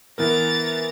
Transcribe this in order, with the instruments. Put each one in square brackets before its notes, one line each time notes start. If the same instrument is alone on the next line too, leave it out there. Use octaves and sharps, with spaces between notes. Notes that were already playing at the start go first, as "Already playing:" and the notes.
[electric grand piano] E3 B3 A#4 [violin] A#5 A6